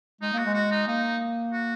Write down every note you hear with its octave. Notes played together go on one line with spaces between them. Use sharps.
G#3 D#4
A#3 F#4
G#3
F#4
D#4
A#3 D#4
F#4